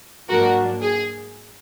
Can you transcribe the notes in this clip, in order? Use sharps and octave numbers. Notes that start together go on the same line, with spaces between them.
G#2 F#3 A#3 D4 F#4 A#4
G#4